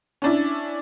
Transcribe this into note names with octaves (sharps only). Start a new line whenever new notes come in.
C#4 D4 E4